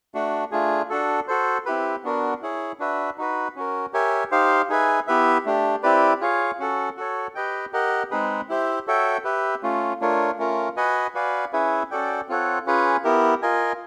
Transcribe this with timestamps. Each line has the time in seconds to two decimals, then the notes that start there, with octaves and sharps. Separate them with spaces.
0.14 A3 D4 F#4
0.51 A3 D4 F4 G#4
0.90 D4 F#4 A4
1.28 F#4 A4 C5
1.66 C4 E4 G4 B4
2.04 B3 D4 F#4 A#4
2.42 E4 G#4 C#5
2.80 D4 F#4 B4 E5
3.18 D#4 F#4 B4
3.56 C#4 F#4 A#4
3.93 G4 A#4 C#5 E5 G#5
4.31 D#4 G4 C5 F5
4.69 D#4 G#4 B4 E5 G#5
5.07 B3 E4 G4 B4 E5
5.45 A3 D4 G4
5.83 C4 E4 G4 B4 D5
6.21 F4 G#4 C#5 F5
6.59 C#4 F#4 A4
6.97 F#4 A4 C#5
7.35 G4 B4 D#5 G5
7.73 G4 A#4 D#5 F#5
8.11 G#3 C4 D#4 G#4 B4
8.49 E4 G4 C5 E5
8.87 F#4 A4 C#5 E5 G5
9.24 G4 B4 E5
9.63 A3 C#4 F4
10.00 A3 D4 F4 A#4 C#5
10.38 A3 C#4 F4 A#4
10.77 F#4 B4 D#5 G#5
11.14 F#4 B4 D5 F5 G#5
11.53 C#4 E4 G#4 B4 E5
11.91 C#4 F#4 A4 D5 G5
12.29 C4 F4 A4 C#5 F#5
12.66 C#4 F4 G#4 B4
13.04 B3 E4 G4 A#4
13.42 F4 A#4 D#5 G#5